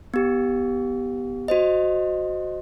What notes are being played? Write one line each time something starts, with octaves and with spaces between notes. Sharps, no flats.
B3 G4
F#4 C5 D#5